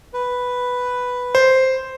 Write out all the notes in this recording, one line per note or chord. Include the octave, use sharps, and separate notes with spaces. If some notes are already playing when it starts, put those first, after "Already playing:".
B4
C5